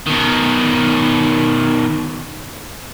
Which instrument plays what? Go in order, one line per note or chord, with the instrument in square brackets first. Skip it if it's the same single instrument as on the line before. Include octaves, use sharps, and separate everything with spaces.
[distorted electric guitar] B2 D#3